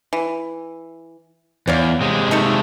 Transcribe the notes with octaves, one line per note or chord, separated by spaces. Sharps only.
E3
E2 C#5 D5 F5
C3 G#3
A3 D#4 A4